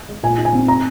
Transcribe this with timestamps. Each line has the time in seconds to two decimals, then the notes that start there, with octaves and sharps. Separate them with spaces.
0.09 G#3
0.23 A#2 G#5
0.38 D#4
0.45 G#5
0.53 C4
0.68 A#5